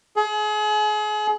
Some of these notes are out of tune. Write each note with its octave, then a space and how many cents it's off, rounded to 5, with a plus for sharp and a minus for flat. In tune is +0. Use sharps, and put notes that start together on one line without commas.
G#4 +35